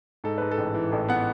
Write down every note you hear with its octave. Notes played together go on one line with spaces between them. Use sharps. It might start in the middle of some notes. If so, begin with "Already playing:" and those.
G#2 A4
G#2 B4
A4
A1
E3
A1 A4
B3 F#5